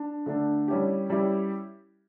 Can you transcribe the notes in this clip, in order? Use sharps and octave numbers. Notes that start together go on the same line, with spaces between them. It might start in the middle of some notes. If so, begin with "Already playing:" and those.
Already playing: D4
D3 A3 D4
G3 C#4 E4 G4
G3 C#4 E4 G4